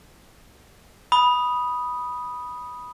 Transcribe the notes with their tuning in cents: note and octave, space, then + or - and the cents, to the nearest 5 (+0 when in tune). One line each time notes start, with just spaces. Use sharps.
B5 -10 D#6 +0